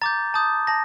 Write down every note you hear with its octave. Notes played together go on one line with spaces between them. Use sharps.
A#5 D6 G6 A6
A5 D#6 G6
A5 A#6